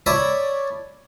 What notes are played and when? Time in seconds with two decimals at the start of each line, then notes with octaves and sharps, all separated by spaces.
0.06 C#5 D5 E5 A5 B5 D#6